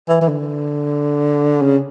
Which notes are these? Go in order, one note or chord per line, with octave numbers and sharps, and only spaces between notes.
E3
E3
D3
C#3